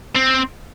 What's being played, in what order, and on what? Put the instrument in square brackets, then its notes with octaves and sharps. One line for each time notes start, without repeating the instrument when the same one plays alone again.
[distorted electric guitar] C4